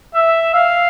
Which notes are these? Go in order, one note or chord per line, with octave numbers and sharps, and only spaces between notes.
E5
F5